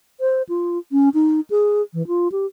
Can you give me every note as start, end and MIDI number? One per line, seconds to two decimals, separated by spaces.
0.21 0.42 72
0.49 0.78 65
0.92 1.09 61
1.14 1.40 63
1.50 1.82 68
1.94 2.06 52
2.08 2.28 65
2.32 2.46 67